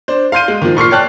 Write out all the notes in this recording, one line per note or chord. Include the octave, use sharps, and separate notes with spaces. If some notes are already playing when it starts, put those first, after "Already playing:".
D4 C5
F5 C6 G6 D#7
G#3
D#3 F3
A#2 C#6 F6 C7
C#5 D5 G5 A5 F#6